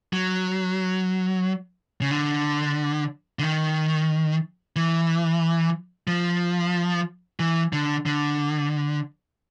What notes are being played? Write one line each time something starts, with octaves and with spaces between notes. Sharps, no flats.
F#3
C#3
D3
D3
D#3
E3
F3
E3
D3
D3